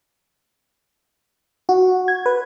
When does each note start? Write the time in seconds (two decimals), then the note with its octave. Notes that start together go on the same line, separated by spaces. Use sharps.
1.69 F#4
2.08 G#6
2.26 B4